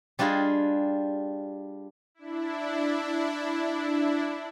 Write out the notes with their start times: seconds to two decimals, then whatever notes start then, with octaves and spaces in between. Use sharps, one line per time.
0.19 G3 D4 F4 G4 G#4 D#5
2.15 D4 E4